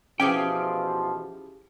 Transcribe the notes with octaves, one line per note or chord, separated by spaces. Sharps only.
B2 E3 F3 C#4 G4 G#4 G5